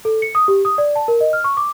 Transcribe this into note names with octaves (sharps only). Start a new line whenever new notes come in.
A4
C#7
D#6
G4
D#6
D5
A5
A#4
D#5
F6
C#6
D6